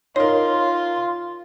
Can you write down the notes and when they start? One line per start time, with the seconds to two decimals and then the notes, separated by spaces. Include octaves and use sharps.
0.16 D#4 F4 A#4 C#5 C6